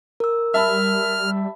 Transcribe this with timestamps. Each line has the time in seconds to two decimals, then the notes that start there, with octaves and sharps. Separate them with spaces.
0.20 A#4 E6
0.54 G3 E5 A5 B5 F6